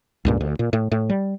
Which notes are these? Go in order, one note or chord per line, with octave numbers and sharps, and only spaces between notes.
C#2 G2 A#2
D2
A#2
A2
A2
G3